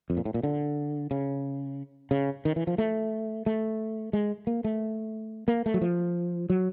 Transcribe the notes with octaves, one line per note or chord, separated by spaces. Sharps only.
F2
A#2
A2
A#2
D3
C#3
C#3
D#3
E3
F3
A3
A3
G#3
A#3
A3
A#3
A3
F#3
F3
F#3